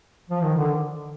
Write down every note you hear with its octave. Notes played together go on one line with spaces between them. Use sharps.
F3
D#3
D3